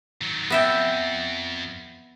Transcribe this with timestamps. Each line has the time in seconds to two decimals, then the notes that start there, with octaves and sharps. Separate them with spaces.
0.21 D#3 F#3
0.50 F2 B3 E5 G5